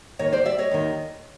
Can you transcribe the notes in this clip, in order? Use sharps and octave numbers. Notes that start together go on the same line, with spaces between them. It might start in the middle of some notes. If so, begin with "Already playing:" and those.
D#2 D#3 C#5 D#5
C5 D5
D5 E5
C#5 D#5
D#2 D#3